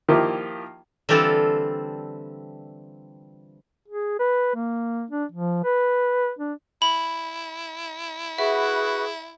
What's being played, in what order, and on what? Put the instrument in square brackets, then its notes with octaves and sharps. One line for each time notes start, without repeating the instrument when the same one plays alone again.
[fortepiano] D#3 F3 A#3 E4 F4 G4
[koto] D3 E3 G3 C4 F4 A4
[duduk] G#4
B4
A#3
D4
F3
B4
D4
[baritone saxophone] E4 [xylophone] B5
[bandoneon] F#4 B4 F#5 [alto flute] G#4 [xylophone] E5